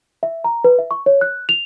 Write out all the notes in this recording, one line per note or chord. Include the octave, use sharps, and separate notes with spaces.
E5
A#5
B4
E5
C#6
C#5
F#6
F7